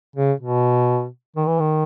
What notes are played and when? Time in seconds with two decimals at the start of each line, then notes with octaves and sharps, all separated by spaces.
0.16 C#3
0.40 B2
1.36 D#3
1.47 E3
1.59 D#3